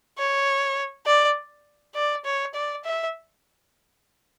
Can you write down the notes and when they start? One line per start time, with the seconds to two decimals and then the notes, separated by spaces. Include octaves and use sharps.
0.18 C#5
1.06 D5
1.95 D5
2.25 C#5
2.54 D5
2.84 E5